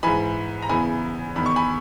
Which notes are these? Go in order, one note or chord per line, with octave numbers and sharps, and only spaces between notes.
G#2 E3 G#5 B5
A#5
E2 C#3 E3 G#5 B5
E2 D#3 B5
C#6
G#5 B5